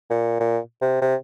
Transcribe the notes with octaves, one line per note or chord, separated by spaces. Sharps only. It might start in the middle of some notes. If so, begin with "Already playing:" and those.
A#2
A#2
C3
C3